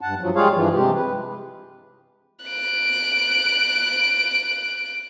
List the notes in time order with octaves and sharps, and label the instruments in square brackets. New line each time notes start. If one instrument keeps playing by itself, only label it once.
[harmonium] G2 F#5 A5
G2 F3 F#3
G3 G#3 F4 G#4 C#5 F5
G2 E3 F3
C3 G#3 G4
B4
[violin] F#6 D7